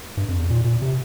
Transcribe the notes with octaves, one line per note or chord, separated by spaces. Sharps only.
G2
F2
E2
A#2
A#2
C3